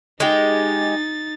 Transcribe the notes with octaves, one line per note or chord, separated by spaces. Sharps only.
G#3 D#4 G4 A6